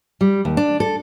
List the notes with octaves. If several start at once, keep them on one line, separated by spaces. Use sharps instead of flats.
G3
D#2
D4
A4